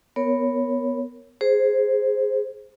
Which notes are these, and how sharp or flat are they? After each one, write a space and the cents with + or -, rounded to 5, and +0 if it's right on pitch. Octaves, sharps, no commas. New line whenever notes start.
B3 +0 A#4 -10 C#5 +0
G#4 +0 C5 +0